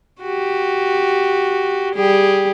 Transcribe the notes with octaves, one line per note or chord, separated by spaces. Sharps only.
F#4 G4
G3 G4 G#4